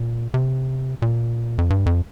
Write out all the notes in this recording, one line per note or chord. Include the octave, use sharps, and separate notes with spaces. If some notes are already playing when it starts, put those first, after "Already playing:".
Already playing: A#2
C3
A#2
F2
G2
F2